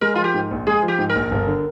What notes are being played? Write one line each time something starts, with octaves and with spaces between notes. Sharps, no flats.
G#3 A#4
F4
F3
G4
G#2
A#1
G#3 G#4
F3
G4
G#2
A#4
A#1
G1
D3